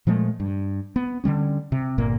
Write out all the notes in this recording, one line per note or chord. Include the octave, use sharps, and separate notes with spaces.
A#2 F3 G#3 A3
G2
B3
D3 F3 G3 C#4
C3
G1 A#2 A#3